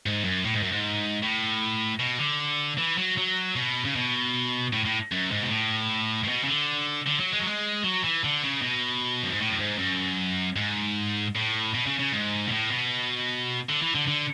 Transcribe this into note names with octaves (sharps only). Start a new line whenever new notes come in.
G#2
F#2
A2
G#2
F#2
G#2
A2
B2
D3
E3
F#3
F#3
B2
C#3
B2
A2
A2
F#2
G#2
B2
A2
A2
B2
C#3
D3
D3
F#3
G#3
F#3
G#3
F#3
E3
D3
C#3
B2
F#2
G#2
A2
F#2
G#2
F#2
G#2
A2
B2
C#3
C#3
G#2
B2
A2
B2
D3
E3
D3
D3